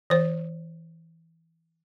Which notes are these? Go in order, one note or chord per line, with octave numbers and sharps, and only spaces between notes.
E3 C5